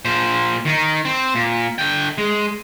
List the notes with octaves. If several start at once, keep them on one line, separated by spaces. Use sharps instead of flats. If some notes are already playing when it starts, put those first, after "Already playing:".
A#2 C5
D#3 D#4
C4
A#2
D3 G5
G#3